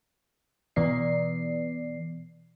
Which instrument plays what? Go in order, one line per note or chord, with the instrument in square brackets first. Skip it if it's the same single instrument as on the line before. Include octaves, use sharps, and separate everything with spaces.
[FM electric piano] B2 E3 B3 D5 C7